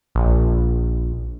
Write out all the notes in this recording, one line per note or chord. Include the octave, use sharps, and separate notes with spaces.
A#1